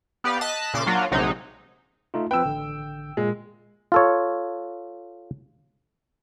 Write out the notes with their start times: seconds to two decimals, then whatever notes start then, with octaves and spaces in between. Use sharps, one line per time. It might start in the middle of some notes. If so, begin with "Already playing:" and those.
0.24 B3 G4 B4 D5 F5
0.41 D#5 A5 F#6 B6
0.74 A#2 C#3 C6 D6
0.87 F#3 A#3 D4 F4 F#4
1.11 A#1 C3 F#3 G#3 D#4
2.14 A3 D#4 F4
2.31 F3 C4 B4 G5 E6
2.45 A1 D3
3.17 A#2 G#3
3.92 F4 A4 C#5